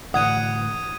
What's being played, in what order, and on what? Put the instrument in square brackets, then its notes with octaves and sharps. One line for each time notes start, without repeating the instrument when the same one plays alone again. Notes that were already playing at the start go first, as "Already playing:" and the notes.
[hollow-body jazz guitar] A2 D3 E3 [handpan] F#5 [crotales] D#6 G#6 D#7